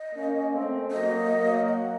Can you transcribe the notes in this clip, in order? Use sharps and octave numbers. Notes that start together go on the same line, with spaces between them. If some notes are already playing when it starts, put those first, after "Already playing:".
Already playing: D#5
A#3 C#4
A3 C4
F#3 A#3 D#5
F#3 A#3
F#5